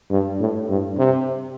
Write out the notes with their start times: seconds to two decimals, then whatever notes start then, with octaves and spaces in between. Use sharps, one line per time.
0.11 G2
0.40 A2
0.69 G2
0.98 C3